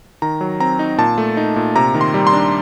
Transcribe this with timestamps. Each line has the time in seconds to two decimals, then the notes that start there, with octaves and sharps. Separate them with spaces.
0.22 D#3 A#5
0.41 F#3
0.60 C4 A#5
0.79 D#4
0.98 A#2 A5
1.18 A3
1.37 D#4
1.56 A#2
1.76 C3 A#5
1.94 D#3
2.01 C6
2.14 G3
2.27 C6
2.33 D4